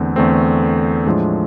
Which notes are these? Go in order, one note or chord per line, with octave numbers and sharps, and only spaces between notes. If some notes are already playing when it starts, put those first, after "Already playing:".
Already playing: E2 D3 A3 C4
E2 D3 A3 C4
A2 F3 G#3 D4